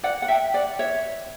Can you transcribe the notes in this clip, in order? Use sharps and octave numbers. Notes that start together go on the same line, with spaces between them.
D5 F#5
F#5
E5 G5
D5 F#5
C#5 E5